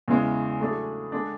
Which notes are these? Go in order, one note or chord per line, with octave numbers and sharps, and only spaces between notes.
E2 C#3 E3 G#3 C#4
A2 F#3 A3 D4 G#4
D3 G#3 D4